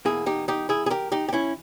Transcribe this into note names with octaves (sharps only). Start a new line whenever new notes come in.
E2 B2 A#3 E4 G#4
D#4 G4
D#4 G4
E4 G#4
G#4
G4 A#4
D#4 G4
G4
C#4 E4